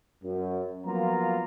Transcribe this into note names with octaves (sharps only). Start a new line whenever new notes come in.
F#2
F3 F#3 A#3 B3 F4 A#5